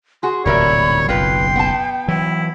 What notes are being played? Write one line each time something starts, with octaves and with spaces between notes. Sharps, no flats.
F#4 G#4 C6
D1 C2 A#2 G3 A#4 C#5 E5 B5
F#1 B1 F4 B4 G5 C6
B3 A5
E3 F#3 E4